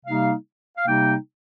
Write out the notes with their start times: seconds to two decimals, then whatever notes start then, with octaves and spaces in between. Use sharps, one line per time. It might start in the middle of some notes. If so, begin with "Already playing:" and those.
0.06 C3 G3 A#3 D#4 F5
0.77 F5
0.87 C3 G3 A#3 D#4 G5